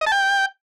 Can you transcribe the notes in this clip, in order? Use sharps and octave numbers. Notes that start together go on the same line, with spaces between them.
D#5
A5
G5